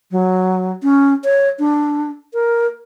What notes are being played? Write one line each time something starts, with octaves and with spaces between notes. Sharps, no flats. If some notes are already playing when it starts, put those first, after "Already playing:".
F#3
C#4
C#5
D4
A#4